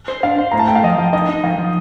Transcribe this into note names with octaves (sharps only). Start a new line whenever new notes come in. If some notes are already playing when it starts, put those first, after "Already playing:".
C5
D4 F5
C5
A2 A#5
A5
A3 G5
F5
F3 D#5
F3 F5
D#4 D#5
D#4
F3 F5
F3